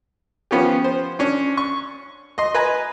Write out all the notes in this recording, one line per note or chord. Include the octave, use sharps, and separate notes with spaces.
F3 B3 C#4 F4 G4
C5
C#4 D4
C#6
D#5 C6
B4 D#5 G#5 A#5